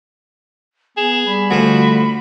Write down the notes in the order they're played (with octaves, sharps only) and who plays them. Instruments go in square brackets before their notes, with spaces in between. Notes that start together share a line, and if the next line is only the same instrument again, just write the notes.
[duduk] B3 [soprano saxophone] G#4 [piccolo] E7
[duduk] G3 [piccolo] B5
[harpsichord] D2 F3 C5 [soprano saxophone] F#4